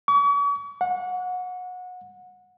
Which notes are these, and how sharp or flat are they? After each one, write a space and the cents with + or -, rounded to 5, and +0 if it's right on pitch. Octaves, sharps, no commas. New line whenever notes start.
C#6 +45
F#5 -25